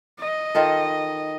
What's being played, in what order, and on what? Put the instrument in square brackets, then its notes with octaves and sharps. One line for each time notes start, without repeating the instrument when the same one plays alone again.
[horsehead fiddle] D#5
[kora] D#3 F4 A4